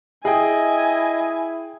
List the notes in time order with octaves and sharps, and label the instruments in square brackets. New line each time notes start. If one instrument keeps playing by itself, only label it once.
[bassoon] E4 [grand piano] G#4 G5 [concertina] D#5 [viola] G#5